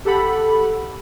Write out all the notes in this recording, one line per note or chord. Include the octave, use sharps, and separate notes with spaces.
G4 A4 F#5 B5